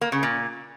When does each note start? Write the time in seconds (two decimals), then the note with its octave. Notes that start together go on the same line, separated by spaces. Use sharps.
0.01 A#3
0.12 C#3
0.23 A#2